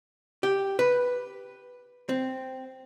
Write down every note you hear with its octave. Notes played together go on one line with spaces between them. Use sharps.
G4
B4
C4